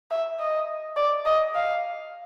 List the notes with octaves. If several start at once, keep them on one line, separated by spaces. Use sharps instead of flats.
E5
D#5
D5
D#5
F5